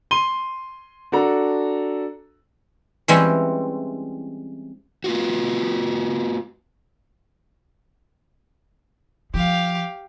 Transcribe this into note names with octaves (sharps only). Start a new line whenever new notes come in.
C6 D#7 G7
D4 F#4 A4 A#5
E3 G3 G#3 C4 C#4 E4
A#3 F4 F#4
F3 G4 F5